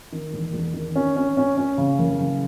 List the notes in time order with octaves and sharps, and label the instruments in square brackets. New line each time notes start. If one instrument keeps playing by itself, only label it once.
[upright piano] D#3
E1
E1
D#3
C#4
C#4
C#4
C#4
C#3
F#1
C#3